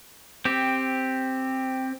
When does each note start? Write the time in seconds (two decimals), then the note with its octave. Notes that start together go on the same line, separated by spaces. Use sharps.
0.45 C4 G4